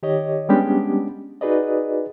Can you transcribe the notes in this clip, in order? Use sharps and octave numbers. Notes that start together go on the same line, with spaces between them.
D#3 G4 C#5 D#5
G3 G#3 B3 C#4 D4 G4
D#4 F#4 G#4 B4 D5 D#5